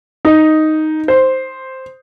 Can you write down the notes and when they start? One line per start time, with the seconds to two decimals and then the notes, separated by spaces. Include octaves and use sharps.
0.25 D#4
1.08 C5